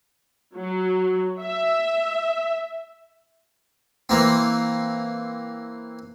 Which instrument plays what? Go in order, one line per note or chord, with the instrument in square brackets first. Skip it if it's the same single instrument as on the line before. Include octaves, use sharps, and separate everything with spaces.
[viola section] F#3
E5
[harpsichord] E3 A#3 C4